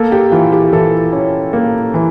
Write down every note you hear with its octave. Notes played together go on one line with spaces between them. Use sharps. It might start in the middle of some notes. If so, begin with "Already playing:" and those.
Already playing: A#3 A4
G4
E3 F4
G4
E3 A4
C#4
A#3
E3